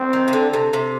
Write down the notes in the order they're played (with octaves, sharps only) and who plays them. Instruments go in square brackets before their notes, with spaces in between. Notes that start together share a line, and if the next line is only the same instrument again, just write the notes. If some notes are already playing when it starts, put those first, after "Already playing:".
Already playing: [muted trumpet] C4
[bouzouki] D#3
C3
D3
C3
C3